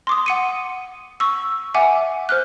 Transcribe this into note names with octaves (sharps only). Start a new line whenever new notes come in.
C6 D6 D#6
F#5 C#7 D#7
C#6 E6
E5 F#5 G#5 D6
C5 F6 F#6